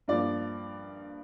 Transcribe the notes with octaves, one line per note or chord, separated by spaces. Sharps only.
G2 F3 A#3 D5